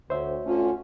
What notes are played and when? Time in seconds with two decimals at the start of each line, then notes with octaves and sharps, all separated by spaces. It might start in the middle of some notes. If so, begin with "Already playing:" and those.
0.10 D2 C5 C#5 E5
0.45 D2 D3 A3 C#4 F4